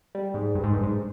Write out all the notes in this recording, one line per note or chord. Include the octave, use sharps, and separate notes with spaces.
G3
G#2
G2
G#2
G2
G#2